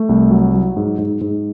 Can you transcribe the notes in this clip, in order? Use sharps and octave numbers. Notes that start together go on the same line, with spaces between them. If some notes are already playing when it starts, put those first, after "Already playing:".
Already playing: A3
C2
F#3
F#3
G#2
G#2
G#2